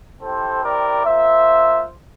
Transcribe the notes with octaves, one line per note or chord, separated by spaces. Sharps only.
C4 E4 G4 A4 C5
A#4 D5
A#3 F4 C5 E5